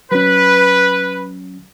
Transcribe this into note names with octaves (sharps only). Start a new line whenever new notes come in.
F#3 C#4 B4